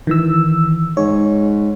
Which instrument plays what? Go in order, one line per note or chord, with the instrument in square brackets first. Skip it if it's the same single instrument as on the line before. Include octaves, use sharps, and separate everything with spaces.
[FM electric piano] D#3 E3 E6
[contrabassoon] G#2 [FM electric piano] C#5